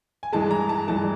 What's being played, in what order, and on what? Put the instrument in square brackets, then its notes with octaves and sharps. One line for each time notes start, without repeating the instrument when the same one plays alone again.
[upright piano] G#5
[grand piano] G2 E3 G#3 [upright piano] A5
[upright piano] A#5
A5
[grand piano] G2 E3 G#3 [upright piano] A5